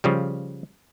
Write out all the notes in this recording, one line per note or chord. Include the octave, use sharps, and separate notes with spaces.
C#3 F3 G3